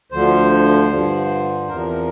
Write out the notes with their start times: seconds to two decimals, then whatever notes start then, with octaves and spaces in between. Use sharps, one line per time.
0.12 D2 D3 F3 C5
0.90 G2 D3 F3
1.68 E2 C3 F3 A#4